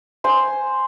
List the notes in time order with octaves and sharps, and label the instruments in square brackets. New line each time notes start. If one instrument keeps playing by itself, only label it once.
[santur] C5 G#5 C6